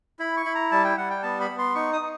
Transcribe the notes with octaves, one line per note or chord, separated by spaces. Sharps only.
E4 B5
C#6
E4 B5
A#5
G3 A5
G5
G3 F#5
G5
B3 A5
B5
B3
C6
D#4 C#6
D#6
D#4